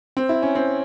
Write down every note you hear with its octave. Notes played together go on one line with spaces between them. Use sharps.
C4
E4
C#4
C4